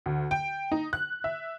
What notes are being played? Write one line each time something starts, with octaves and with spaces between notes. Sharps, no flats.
D2
G5
D#4
F#6
E5